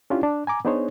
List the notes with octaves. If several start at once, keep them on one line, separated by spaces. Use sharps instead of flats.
C#4 D4 E4 F4 G4
D4
G#5 A#5 D6
B3 D4 D#4 G#4 C5 C#5